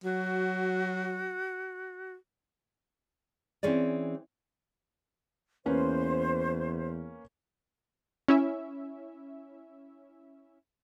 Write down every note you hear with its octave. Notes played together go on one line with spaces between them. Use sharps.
F#3 F#4
E3 C4 C#4 G#4 D5
E2 A#3 C#4 B4 C5
C#4 E4 E5